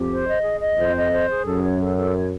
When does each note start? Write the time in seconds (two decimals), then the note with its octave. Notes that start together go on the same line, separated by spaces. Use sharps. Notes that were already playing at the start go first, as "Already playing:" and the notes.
Already playing: F2 G4
0.10 C5
0.27 D#5
0.44 G#4
0.60 D#5
0.77 F2 C5
0.95 D#5
1.11 C5
1.29 G#4
1.45 F#2 A4
1.62 C#5
1.79 A4
1.96 A4
2.14 C#5